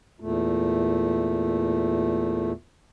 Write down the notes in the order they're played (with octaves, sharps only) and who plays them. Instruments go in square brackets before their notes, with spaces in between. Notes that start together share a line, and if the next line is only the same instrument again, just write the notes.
[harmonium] E2 A#2 A3